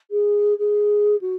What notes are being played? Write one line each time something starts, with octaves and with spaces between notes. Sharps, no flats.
G#4
G#4
F#4